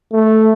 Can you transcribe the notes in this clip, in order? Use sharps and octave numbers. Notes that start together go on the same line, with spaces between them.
A3